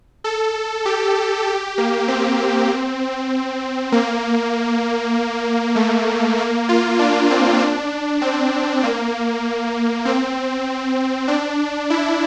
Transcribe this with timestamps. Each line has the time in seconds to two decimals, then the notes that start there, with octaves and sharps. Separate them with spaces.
0.24 A4
0.85 G4
1.47 G4
1.78 A#3
2.08 C4
3.92 A#3
5.76 A3
6.38 A#3
6.69 F4
6.99 D4
7.30 C4
7.60 D4
8.21 C4
8.83 A#3
10.05 C4
11.28 D4
11.90 E4